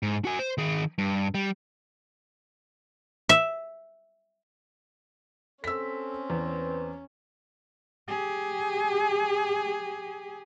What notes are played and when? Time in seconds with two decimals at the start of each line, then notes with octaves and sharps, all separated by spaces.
0.03 G#2
0.25 F#4 G#5
0.39 C5
0.58 D#3 G#4
0.98 G2
1.34 G3
3.29 E5
5.64 C4 C#4 A4 E6 B6
6.30 E2 B4
8.08 G4 G#4